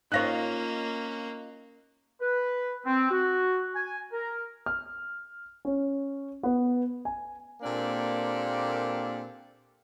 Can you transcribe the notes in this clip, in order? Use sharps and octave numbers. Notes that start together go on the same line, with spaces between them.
A#3 C#4 D#4 F4 C#5 F#6 A#6
B4
C4
F#4
G#5
A#4
F6
C#4
B3
G#5
A#2 A#3 C4 D4 G4 A4